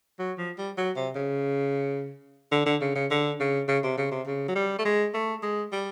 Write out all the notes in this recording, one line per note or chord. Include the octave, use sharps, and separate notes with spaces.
F#3
F3
G3
F#3
C3
C#3
D3
D3
C#3
C#3
D3
C#3
C#3
C3
C#3
C3
C#3
F#3
G3
A3
G#3
A3
G#3
G3